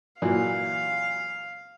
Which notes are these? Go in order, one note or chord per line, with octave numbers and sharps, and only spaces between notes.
A#2 E3 F#3 F5